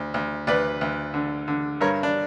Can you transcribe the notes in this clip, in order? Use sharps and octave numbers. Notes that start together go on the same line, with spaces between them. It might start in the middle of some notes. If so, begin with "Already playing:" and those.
Already playing: D2
D2
D2 B4 D5
D2
D3
D3
G2 A#4 C#5
D4